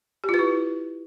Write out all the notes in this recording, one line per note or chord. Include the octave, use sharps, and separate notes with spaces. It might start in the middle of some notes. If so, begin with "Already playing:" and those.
G4
F4
B4
E4